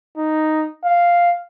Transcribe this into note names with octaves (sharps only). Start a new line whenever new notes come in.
D#4
F5